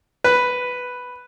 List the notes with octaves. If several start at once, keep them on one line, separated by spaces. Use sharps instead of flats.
B4